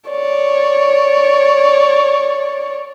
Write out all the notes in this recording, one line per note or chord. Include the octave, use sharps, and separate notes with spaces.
C#5 D5